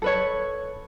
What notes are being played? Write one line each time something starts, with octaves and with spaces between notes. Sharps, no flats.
A4 B4 C#5